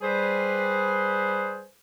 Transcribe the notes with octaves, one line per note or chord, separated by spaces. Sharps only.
G3 G#4 B4 C5